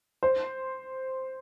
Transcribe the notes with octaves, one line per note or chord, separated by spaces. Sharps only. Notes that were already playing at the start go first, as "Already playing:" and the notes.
C5